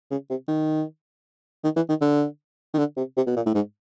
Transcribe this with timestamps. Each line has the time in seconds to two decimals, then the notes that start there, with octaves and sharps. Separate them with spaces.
0.11 C#3
0.30 C3
0.48 D#3
1.64 D#3
1.76 E3
1.89 D#3
2.01 D3
2.74 D#3
2.78 D3
2.97 C3
3.17 C3
3.27 B2
3.36 A#2
3.46 A2
3.54 G#2